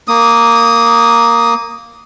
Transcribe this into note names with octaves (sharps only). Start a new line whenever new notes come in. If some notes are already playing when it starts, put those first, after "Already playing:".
A#3 D#6